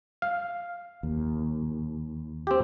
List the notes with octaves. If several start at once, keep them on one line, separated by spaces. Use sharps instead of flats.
F5
D#2
C4 G4